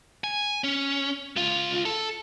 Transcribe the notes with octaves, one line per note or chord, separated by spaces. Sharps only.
G#5
C#4
C#2 F4
A4